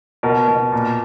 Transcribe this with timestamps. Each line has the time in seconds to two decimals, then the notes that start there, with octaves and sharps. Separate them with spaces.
0.23 B2 A#4
0.48 B2
0.72 A#2